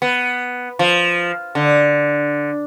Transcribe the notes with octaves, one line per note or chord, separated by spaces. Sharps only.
B3
F3
D3